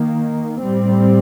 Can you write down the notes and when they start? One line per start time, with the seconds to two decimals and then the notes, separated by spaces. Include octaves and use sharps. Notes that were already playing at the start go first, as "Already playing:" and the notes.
Already playing: D#3 A#3
0.62 A2 G3 C4